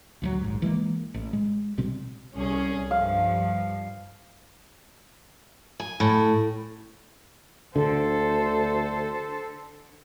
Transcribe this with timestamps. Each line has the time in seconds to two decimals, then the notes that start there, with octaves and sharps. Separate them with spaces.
0.22 D2 F3 F#3
0.41 D#1 A#1 G#2
0.62 E3 G#3 A#3
1.14 A1
1.33 G#3
1.77 A1 B2 G3 C4
2.35 C2 C#4 G#4
2.91 G2 F3 F5
5.80 G#5
6.00 A2
7.76 D2 D3 A4 C5